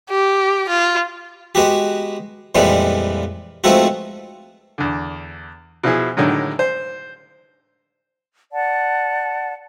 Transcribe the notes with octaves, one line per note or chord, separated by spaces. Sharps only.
G4
F4
G#3 B3 F#4 G4
F2 A#2 E3 G3 G#3 B3
G#2 F3 A3 B3 C4 F#4
E2 D3
B2 F3 E4 G#4
A2 D3 D#3 F#3 G#3
C5
D5 F#5 A5